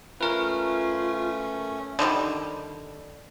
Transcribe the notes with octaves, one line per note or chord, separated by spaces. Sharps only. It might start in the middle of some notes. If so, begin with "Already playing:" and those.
A3 C#4 F4 A#4 B4
D3 D#3 F3 G3